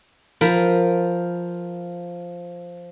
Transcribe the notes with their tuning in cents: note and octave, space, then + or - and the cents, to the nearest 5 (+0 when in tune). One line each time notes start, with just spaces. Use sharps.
F3 +0 A#4 -5 B5 +0